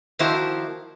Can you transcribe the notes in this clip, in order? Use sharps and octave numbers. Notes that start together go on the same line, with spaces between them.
D#3 F3 A#3 E4 F#4 C5